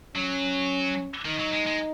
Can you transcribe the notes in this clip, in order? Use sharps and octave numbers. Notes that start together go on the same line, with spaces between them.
F#3 C#4
D#3 D#4
F#3
G#3
G#3